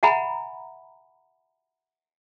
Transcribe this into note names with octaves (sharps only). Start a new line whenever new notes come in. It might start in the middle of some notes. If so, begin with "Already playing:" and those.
E5 F#5 G#5 A#5 B5